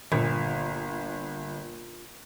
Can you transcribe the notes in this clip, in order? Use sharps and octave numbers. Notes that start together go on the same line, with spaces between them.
G1 A#2